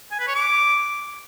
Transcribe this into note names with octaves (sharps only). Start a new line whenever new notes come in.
G#5
B4
C#5
D6